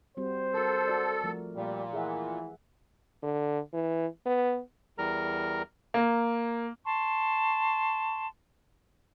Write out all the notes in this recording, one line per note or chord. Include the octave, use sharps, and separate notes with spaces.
G3 C4 F#4 C5
F#4 A4 A#4
F#4 D5
F3 A3 A#4
A#2 G3
E3 G#4 E5 F#5
D3
E3
B3
E2 G3 A#4 A#5
A#3
A5 C6 C#6